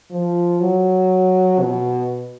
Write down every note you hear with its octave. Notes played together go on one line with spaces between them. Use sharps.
F3
F#3
B2